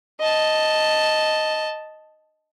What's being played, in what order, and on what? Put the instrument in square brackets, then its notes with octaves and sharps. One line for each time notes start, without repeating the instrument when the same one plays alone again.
[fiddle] D#5 A5